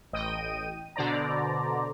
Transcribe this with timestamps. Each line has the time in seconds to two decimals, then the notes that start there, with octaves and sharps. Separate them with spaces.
0.13 A1 D#5 G5 D#7
0.96 B2 D3 C5 D5 A#5